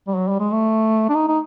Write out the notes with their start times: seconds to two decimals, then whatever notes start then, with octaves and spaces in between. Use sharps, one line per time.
0.08 G3
0.16 F#3
0.28 G3
0.40 G#3
0.52 A3
1.09 D4
1.15 D#4
1.28 D#4